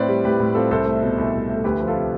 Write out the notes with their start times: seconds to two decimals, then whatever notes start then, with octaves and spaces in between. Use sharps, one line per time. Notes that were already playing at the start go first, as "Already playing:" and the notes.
Already playing: A2 C4 B4 D5
0.08 G3
0.25 A2 G4 B4
0.40 A2
0.55 C4 F4 A4
0.71 C2 A4 C5
0.86 A3
1.02 B2
1.18 C2
1.34 C2
1.49 A3
1.56 A4
1.64 D2 G4 B4
1.80 F3
1.87 F4 A4
1.96 C3